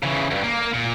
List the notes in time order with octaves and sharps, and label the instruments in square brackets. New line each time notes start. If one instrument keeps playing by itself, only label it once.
[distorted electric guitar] C#3 E3
D2 G2
A#3
A#2